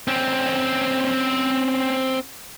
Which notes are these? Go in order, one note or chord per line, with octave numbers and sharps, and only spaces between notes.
C4 C#4